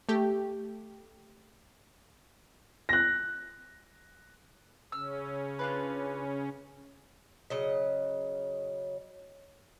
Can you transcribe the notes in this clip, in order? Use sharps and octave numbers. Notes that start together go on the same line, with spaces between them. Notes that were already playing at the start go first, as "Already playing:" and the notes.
A3 G4
F#6 A#6
C#3 C#4 E6 F6
D4 F4 B4
C#3 F#3 D#5